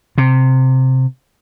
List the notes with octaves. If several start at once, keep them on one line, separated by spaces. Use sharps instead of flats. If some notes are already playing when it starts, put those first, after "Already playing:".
C3